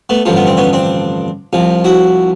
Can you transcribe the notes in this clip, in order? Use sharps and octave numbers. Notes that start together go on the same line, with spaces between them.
A3 B3
A1 G2 D3 F3
B3
C4
B3 C#4
C4 D4
C2 C3 F3
E4 F#4